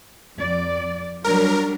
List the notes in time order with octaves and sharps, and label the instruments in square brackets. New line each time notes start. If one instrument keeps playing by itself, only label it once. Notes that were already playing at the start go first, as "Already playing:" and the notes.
[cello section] F2 D5
[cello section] F#3 G3 D4 [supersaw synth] A#4